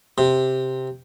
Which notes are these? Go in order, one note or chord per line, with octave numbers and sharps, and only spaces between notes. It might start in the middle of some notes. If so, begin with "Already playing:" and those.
C3